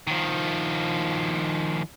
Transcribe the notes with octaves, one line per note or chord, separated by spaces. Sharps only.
D#3 F3